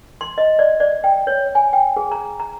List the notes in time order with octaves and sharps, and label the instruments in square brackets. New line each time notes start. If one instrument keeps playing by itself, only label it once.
[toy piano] C6
D#5
D5
D5
G5
C#5
G#5
G5
G#4
A#5
A#5